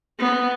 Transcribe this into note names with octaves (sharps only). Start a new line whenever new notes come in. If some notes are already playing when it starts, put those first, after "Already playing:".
B3